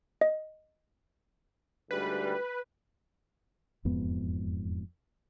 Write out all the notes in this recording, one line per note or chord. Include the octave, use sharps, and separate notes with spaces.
D#5
D2 G#2 G3 B4
E1 F2 G#2 B3